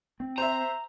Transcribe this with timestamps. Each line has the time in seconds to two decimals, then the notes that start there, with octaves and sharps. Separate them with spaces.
0.20 C4
0.38 C5 E5 A#5